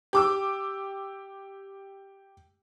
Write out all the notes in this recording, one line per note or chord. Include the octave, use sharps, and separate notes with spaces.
G4 D6 E6